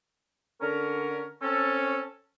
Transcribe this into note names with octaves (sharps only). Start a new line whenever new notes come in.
D3 C#4 A#4
C4 C#4 A4